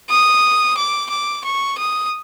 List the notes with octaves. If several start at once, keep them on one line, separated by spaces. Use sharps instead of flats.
D#6
D6
D6
C#6
D#6